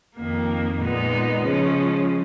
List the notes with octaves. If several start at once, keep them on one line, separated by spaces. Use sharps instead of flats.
F2 D#3 A#3
A#2 G#3 B3 D#4
C#3 F3 G#3 C#4